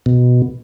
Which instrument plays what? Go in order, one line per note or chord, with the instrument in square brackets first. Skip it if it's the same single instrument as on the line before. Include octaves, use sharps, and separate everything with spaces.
[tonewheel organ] B2